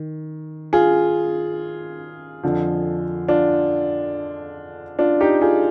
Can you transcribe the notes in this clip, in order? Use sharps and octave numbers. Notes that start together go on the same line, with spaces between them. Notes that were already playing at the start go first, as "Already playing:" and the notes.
Already playing: D#3
F4 G#4
F2 D3 F3
D4 F4
D4 F4
D#4 G4
F4 G#4